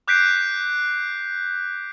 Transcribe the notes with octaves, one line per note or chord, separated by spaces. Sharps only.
D6 F#6 G6 B6 C7 D7